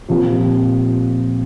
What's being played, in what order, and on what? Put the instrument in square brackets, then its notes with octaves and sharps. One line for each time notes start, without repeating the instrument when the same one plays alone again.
[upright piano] A#2 F3 C4 G4